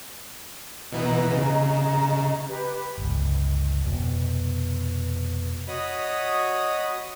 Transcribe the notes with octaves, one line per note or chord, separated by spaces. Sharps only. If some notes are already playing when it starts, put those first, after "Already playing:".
B2 E3 B3 D#5 A#5
C#3
G4 B4
G1 C#2
F1 B2
F#4 C#5 D#5 B5 D#6